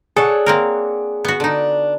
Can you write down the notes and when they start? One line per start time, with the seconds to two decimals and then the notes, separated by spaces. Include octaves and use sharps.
0.16 D4 G#4 A4 C#5 F#5
0.46 A#3 C4 A#4
1.25 B3 F#4
1.40 D3 D4 D#4